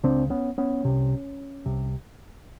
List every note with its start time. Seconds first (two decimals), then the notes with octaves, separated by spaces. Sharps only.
0.04 C#2 C#3 C4 D4
0.30 B3 C#4
0.58 B3 C#4
0.85 C2 C3
1.66 C2 C3